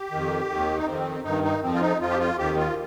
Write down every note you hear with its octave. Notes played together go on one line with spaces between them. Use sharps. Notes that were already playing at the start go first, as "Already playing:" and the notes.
Already playing: G4
F2 D#3
D#2 D#3
D#4
F2 D#3 C4
G2 D#3 D#4
D#4
F2 F3 C4
F4
D#4
F2 F3 F4
G4
F4
D#2 D#3 G4
F4